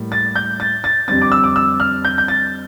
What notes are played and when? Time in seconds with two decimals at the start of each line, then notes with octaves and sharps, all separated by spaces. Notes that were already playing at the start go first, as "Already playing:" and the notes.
Already playing: A2 G3 A#3
0.12 A6
0.36 G6
0.60 A6
0.84 A6
1.08 F2 D3 G3 C4 A6
1.22 D6
1.32 E6
1.44 D6
1.56 E6
1.80 F6
2.05 G6
2.18 G6
2.28 A6